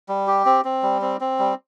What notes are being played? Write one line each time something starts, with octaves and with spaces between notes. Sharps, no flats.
G3
G4
C4
C4
G3
C4
C4
G3